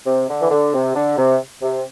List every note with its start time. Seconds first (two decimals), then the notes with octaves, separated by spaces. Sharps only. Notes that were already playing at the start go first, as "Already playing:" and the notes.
0.06 C3
0.29 D3
0.40 E3
0.51 D3
0.74 C3
0.95 D3
1.18 C3
1.62 C3